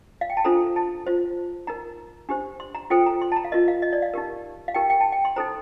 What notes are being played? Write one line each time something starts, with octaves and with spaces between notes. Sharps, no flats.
F5
G5
A5
D4 F4 A4 C5 A#5
A5
F4 C5
D#4 A#4 A#5
D4 G4 C5
C6
A#5
F4 A4 C5 G5
A#5
C6
A5
A#5
F5
F4 A#4 D#5
F5
D#5
D5
F5
D#4 G4 A#4
F5
D#4 G4 A#4 G5
G5
A5
G5
C6
D#4 A4 C5 A#5